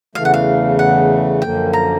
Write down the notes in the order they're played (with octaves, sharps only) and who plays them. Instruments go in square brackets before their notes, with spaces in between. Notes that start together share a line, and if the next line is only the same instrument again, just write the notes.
[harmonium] E2 C#3 E3 A3 [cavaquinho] F5
[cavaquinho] F#5
F5
F#5
[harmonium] F#2 D3 F3 A#3 [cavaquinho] G5
[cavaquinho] A#5